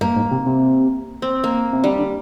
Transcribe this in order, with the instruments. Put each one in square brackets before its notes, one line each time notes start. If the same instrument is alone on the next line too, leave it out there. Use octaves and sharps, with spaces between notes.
[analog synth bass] G2 [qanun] A#3
[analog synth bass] G#2
C3
C3
[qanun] C4
A#3
[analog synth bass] C3
[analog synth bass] D3 [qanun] G3
[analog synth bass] D3